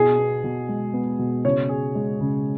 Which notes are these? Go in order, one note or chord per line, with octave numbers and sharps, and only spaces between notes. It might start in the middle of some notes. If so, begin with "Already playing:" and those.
Already playing: B2 G#4
B3
B2
G#3
B3
B2
C#3 C#5
G#4
G#3
C#3